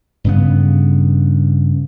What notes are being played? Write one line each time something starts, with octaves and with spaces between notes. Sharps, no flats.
G2 C#3 B3